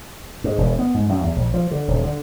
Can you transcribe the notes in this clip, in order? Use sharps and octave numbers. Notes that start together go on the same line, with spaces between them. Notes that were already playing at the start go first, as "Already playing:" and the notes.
G#2
E1
B3
G#2
F#2
E2
A#1
F3
D3
D#1
D3